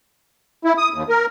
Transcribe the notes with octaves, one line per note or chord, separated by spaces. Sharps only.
E4
D#6
D#2
A#4